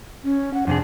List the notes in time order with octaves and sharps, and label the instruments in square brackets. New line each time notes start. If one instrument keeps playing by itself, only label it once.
[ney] C#4
F#5
[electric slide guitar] F2 C3 G#4 [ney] D4